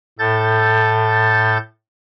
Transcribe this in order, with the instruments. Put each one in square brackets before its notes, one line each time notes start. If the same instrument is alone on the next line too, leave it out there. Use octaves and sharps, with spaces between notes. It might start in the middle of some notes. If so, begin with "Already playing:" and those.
[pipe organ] A2 A4 G6 A6